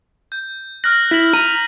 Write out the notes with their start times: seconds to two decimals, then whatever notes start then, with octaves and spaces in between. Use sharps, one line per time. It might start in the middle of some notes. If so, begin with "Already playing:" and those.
0.32 G6
0.84 F6 F#6 A#6
1.11 E4 B6 F#7
1.34 A#5 D#7